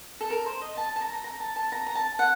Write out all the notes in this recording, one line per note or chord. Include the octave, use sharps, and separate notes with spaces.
A4
A#4
C5
D#5
A5
A5
A#5
A#5
A#5
A5
A5
A#5
A#5
A5
F#5